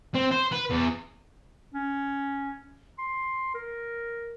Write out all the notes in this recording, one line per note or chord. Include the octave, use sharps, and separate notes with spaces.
C4
C5
B4
E2
C#4
C6
A#4